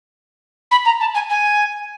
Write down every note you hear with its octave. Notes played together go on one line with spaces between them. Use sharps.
B5
A#5
A5
G#5
G#5